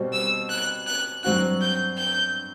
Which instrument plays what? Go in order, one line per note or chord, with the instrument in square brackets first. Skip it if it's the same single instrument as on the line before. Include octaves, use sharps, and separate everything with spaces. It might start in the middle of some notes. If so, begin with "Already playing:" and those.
Already playing: [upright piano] B2 G3 C4 F#4 C5
[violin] E6
F#6
F#6
[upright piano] G2 F#3 C4 F#4 [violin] F#6
[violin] G6
G6